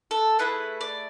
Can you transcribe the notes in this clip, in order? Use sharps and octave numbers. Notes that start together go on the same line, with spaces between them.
A4
A3 E4 G#4 B4
D5